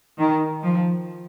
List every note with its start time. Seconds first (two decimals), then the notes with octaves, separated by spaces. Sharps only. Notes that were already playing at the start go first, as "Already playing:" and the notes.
0.18 D#3
0.63 F3